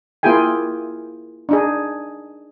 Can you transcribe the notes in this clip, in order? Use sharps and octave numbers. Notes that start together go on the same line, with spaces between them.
A#3 E4 F4 G#4 G5 G#5
D4 D#4 G#4